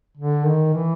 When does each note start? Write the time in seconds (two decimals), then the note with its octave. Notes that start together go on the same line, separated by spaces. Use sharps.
0.17 D3
0.45 D#3
0.74 E3